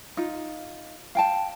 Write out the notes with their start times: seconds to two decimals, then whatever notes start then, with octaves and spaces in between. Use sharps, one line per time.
0.17 D#4 F4
1.15 F5 G5 A5